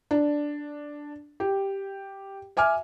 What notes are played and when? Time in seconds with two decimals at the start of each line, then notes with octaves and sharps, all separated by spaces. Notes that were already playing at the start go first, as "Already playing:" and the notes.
0.11 D4
1.40 G4
2.57 E5 G#5 D6 F6